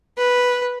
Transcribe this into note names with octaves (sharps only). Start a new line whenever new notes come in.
B4